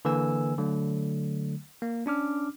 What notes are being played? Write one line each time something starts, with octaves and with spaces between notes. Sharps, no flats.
D3 E3 A#3 B4 G#5 E6
D3 F#3 A3
A#3
C#4 D4 D6 F6